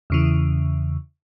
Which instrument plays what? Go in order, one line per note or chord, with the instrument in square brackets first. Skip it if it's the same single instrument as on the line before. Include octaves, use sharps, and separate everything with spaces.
[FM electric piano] E2 C#3 E3